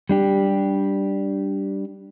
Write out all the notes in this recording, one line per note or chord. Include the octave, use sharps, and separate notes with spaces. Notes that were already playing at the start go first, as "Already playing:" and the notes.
G3 D4 G4